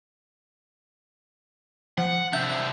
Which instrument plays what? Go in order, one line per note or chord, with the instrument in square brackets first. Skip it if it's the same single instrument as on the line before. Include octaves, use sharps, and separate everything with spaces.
[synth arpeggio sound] F3 [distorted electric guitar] F#5
[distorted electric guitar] C3 D4 [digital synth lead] E5 [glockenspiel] G6